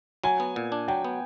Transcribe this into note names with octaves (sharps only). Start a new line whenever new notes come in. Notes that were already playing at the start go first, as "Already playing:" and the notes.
F#3 G#5
B3
A#2
D4
F#3 G5
B3